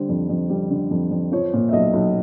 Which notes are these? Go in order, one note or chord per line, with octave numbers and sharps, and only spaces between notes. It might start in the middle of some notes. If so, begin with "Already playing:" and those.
Already playing: D3 G3 C5
F2
F2
G3
D3
F2
F2
F3 C#5
A#2
E5
B1 D#5
B1